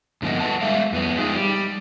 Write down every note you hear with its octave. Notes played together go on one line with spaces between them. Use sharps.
G2 D3 F3 A#3 B3 D#5
A4 B4 C#5 F#5 A5
G3 G#3 E5 F5
F2 B3
F3 G#3 D#4 F4
G3